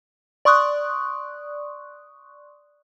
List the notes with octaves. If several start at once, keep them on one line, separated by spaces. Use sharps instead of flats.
D5 C6 C#6 D#6 F#6